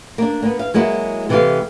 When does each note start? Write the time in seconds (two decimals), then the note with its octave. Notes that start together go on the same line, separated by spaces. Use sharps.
0.18 A#3 D4
0.43 A#3 B3
0.59 F5
0.74 F#3 G#3 A#3 E4 F#4
1.29 C3 E3 G#3 G4 A4 F5